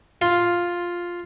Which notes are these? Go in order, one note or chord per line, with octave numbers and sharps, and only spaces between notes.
F4